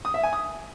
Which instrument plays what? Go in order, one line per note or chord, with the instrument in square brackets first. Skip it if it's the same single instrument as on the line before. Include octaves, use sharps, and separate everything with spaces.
[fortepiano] D#6
E5
G#5
D#6